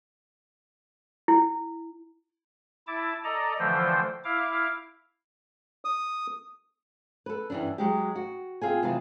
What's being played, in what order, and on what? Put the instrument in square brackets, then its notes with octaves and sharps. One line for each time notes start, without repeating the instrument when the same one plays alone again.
[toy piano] E4
[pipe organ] E4 A5 D6
A4 D5 D#5 A#5
D3 E3 F3 A3 C5 G5
E4 F5 D6
[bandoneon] D#6
[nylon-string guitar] A4 B4
E2 G2 E3 C#4 D4
F#3 G#3 G4
F#4
C4 F4 G#4 G#5
C3 E3 F#3 F4 G#4 A5